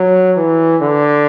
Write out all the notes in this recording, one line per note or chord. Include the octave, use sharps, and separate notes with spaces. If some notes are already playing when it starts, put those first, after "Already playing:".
Already playing: F#3
E3
D3